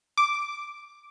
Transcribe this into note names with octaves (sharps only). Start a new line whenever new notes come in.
D6